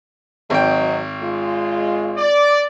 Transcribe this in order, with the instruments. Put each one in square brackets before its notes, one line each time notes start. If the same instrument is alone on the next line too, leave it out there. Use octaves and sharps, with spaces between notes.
[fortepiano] G#1 G5 [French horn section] F#3 C4 D#5
[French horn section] G#3 F4
[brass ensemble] D5